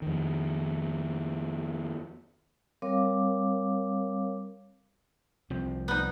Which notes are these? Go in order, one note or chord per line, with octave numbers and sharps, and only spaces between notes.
F2 D#3
G3 C4 A#4 C#5 F5 D6
C2 F3 C4
B3 D#4